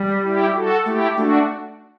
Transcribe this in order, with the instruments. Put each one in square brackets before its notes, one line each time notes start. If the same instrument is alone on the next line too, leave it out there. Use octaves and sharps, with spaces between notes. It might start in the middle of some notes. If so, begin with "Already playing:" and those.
Already playing: [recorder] G3
[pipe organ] E4 G4
F#4 A4
[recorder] A3 [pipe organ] E4 G4
[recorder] A3 [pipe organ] D4 F#4